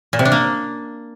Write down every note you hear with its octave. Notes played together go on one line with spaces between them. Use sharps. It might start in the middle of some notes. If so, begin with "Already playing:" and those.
A#2
C3
D4
A#3